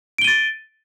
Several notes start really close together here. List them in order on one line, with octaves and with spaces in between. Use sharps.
D7 G7 D#7 A6